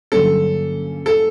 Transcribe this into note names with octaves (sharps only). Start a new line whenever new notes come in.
G2 D3 F#3 A#3 C#4 A4
A4